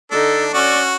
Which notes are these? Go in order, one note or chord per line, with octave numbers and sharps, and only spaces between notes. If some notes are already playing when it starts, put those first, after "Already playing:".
D3 D4 D#4 A4
C#4 F#4 D5